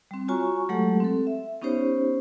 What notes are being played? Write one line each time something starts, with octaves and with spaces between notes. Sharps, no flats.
G3 C4
F4 F#4 C#5 G#5 A#5 C#6
F#3 G#3 A3 G4 A4 F#5
C4 A4
E5
B3 C#4 D#4 G4 C5 C#5